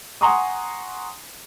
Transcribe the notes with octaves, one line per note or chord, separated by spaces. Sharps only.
F#5 G#5 A#5 C6 C#6 D#6